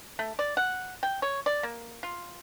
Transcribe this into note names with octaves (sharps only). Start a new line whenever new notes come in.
A3
D5
F#5
G5
C#5
D5
A#3
F4